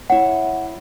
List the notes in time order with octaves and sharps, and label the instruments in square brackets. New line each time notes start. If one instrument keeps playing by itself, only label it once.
[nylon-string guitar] E4 C#5 [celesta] F#5